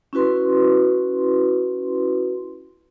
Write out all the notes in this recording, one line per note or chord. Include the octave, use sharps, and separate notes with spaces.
C#4 E4 F#4 B4 C6